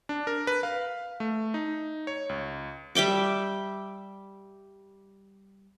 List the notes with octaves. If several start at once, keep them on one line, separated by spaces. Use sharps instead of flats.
D4
A#4
B4
F5
A3
D#4
C#5
C#2
G3 E5 G5 D6